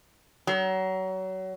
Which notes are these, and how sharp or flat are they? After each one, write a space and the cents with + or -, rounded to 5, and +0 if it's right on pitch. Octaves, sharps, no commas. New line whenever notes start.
F#3 +30